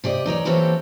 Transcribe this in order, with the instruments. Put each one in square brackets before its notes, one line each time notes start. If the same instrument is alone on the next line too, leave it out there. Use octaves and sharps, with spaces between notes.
[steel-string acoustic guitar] C3 G4 D5 D#5
E2 D#4 C#5 D5
E3 A#3 C4 G4 A4 C#5